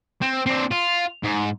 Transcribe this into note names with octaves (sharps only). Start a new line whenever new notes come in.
C4
C4 D4
F4
G#2